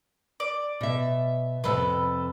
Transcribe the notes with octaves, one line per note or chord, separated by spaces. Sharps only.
D5
B2 E5
F2 A2 C3 A4 B4